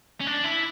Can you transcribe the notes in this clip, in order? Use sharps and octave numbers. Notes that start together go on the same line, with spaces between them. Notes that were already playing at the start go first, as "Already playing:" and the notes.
C#4
D4
E4